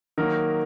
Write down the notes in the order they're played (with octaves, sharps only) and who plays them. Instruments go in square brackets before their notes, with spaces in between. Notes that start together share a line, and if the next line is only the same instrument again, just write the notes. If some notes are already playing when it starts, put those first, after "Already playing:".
[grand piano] D#3 F#3 A#3 A#4